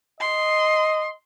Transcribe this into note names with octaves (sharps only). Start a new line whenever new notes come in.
D#5 C6